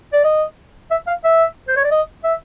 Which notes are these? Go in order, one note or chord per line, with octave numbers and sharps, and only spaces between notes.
D5
D#5
E5
F5
E5
C5
C#5
D5
D#5
E5